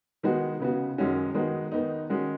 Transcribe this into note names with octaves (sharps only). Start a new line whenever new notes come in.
D#3 G#3 B3 D#4 F#4
C#3 B3 F#4
F#2 D#3 G#3 C#4 F#4
D#3 G#3 B3 D#4 F#4
D#3 B3 D#4
D#3 G#3 C#4 F#4